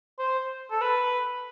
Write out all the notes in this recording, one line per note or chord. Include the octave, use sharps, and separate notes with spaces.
C5
A4
B4